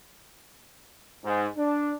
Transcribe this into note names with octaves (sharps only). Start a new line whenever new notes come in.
G#2
D4